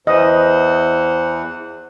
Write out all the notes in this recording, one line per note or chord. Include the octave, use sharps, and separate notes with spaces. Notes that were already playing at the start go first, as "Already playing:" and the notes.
E2 E3 C5 D#5 F#5